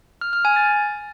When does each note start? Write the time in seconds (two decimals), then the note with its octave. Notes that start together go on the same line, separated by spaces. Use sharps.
0.21 F6
0.33 F6
0.45 G#5
0.56 A6